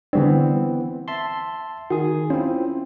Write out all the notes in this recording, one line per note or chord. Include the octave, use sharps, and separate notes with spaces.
D3 E3 G3 B3 C4 D4
E5 A5 C6
D#3 F#4 G#4
C4 C#4 E4 F4